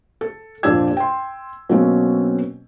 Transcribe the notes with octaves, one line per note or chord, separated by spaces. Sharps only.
A4
F2 A#2 D4 G4 E6 G#6
G5 C6
B2 F#3 A#3 C4 C#4